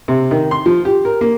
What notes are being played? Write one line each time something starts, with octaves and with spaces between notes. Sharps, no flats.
C3
D#3
C6
F3
G4
A#4
A#3